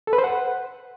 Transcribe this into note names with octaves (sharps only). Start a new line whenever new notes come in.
A4
B4
C5
F#5